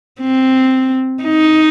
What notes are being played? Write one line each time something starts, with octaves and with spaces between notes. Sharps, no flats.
C4
D#4